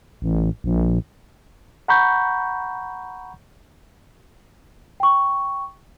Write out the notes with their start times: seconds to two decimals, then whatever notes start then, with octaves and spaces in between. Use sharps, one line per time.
0.22 A1
0.64 A#1
1.88 F#5 A#5 B5 C#6 G6
5.00 G5 C#6